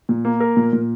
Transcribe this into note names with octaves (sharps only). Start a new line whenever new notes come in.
A#2
A#3
A#4
A#2
A#2